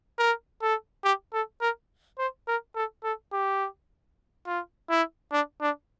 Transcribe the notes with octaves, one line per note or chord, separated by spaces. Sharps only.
A#4
A4
G4
A4
A#4
C5
A#4
A4
A4
G4
F4
E4
D4
D4